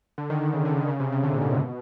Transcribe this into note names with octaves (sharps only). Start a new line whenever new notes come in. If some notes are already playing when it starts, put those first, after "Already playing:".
D3
D#3
D3
C#3
D3
C#3
C#3
C3
C#3
D3
A#2
G#2
B2